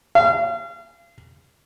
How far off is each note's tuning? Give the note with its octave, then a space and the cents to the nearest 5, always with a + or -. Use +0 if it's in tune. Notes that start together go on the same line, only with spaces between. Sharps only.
F5 -35